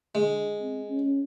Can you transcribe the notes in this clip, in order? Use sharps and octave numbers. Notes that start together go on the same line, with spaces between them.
D3 G#3
C4
C#4